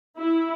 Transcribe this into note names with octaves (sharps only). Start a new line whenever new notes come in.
E4